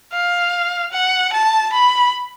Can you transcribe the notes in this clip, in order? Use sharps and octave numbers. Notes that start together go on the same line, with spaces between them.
F5
F#5
A5
B5